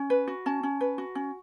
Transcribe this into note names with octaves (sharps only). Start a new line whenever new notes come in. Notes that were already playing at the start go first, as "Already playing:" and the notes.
Already playing: C#4
B4
F#4
C#4 A5
C#4
B4
F#4
C#4